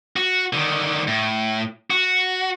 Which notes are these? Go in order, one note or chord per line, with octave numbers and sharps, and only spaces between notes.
F#4
D3 D#3
A2
F#4